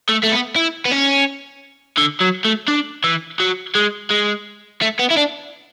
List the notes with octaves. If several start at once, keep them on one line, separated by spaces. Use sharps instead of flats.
A3
A3
B3
E4
B3
C#4
D3
F#3
A3
D4
E3
F#3
G#3
G#3
A3
B3
E4
D4